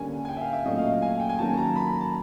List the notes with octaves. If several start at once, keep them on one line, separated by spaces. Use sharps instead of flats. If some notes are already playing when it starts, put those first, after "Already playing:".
Already playing: D3 G3 A#3 C#4 G#5
G#5
G5
E5
F5
E5
A#2 F#3 A3 C#4 D#5
F5
G#5
G5
G#5
D#3 F#3 A#3 C#4 A5
A5
A#5
B5
A#5
A5